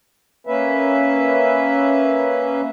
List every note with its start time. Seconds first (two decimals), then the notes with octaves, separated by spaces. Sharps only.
0.47 A#3 C#4 B4 E5